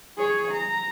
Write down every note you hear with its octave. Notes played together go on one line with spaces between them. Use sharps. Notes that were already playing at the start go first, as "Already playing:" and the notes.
G#4 C#5
A#5